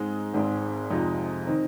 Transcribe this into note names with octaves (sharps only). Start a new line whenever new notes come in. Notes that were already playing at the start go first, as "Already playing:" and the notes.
Already playing: G#2 G#3 C4 D#4
G#1 G#2 G#3 C4
F2 C3 F3 G#3 D#4
D#3 C4 D#4